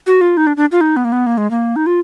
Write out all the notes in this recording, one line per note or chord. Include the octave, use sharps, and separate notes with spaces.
F#4
F4
D#4
D4
D4
F4
D#4
B3
A#3
B3
A#3
G#3
A#3
D#4
F4